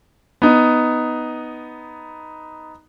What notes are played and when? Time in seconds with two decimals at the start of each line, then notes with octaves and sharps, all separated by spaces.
0.42 B3 D#4